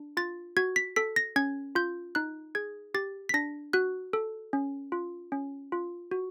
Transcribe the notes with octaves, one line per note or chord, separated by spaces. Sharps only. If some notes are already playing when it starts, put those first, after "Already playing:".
Already playing: D4
F4 A6
F#4 G#6
B6
A4 B6
A#6
C#4 G#6
F4 G6
D#4 F#6
G#4 G#6
G4 A6
B6
D4 A#6
F#4 F#6
A4
C#4
F4
C#4
F4
F#4